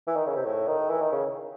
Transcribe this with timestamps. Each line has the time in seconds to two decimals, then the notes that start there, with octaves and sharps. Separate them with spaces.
0.07 E3
0.16 D#3
0.26 C#3
0.36 C3
0.45 A2
0.68 D#3
0.90 E3
1.01 D#3
1.12 C#3